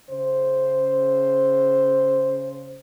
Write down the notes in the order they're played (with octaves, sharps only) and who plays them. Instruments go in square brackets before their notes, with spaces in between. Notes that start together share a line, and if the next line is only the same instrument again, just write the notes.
[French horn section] C#3 C5